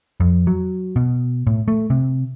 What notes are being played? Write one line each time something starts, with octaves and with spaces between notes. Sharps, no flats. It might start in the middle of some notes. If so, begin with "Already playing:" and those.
F2
F#3
B2
A2
A3
C3